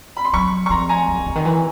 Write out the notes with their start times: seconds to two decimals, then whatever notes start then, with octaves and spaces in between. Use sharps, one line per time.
0.17 B5
0.25 C6
0.33 F#3 B5 C#6
0.66 C#6
0.70 F3 A#5 C6
0.89 G#5 A#5
1.08 F3
1.17 E3
1.26 D3
1.35 D#3
1.45 E3